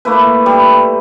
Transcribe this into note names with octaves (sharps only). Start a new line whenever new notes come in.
A3 A#3 E4 B4
G3